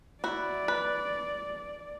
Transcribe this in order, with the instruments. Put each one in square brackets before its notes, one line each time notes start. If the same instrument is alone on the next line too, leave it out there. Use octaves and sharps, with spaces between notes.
[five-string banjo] E4 F#4 [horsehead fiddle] D5
[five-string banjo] B4